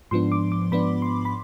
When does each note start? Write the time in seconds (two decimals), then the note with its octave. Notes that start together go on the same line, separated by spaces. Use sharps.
0.11 G#2 F3 B3 D4 C6
0.32 D6
0.52 D6
0.72 G#2 F3 B3 D4 B5
1.02 C6
1.25 B5